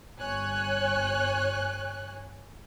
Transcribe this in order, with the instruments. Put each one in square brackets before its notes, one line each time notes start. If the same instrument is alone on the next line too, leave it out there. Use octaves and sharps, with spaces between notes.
[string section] G1 C#5 G#5 F#6